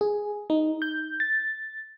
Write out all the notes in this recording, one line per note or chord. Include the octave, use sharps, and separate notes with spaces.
G#4
D#4
G6
A6